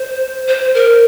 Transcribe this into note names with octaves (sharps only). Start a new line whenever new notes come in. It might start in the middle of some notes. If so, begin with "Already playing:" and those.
Already playing: C5
C5
A#4